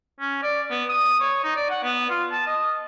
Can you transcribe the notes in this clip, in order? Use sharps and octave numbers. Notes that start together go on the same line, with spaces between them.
C#4
D5
B3
D#6
C#5
D#4
D5
F#5
B3
F4
A5
D#5